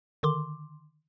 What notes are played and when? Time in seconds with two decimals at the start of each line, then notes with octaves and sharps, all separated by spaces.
0.23 D3 D#3 C6 D6